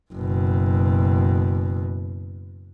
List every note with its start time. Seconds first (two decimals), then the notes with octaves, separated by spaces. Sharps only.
0.13 F#1 B2